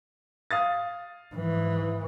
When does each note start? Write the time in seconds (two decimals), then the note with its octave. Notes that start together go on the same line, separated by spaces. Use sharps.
0.51 F5 D#6 A6
1.35 G#2 E3